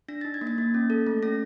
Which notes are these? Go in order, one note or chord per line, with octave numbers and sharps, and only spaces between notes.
D4 A#6
D#4 A6
G#6
A#3
A6
A#3
C#4
A4
A3
C#4 A#6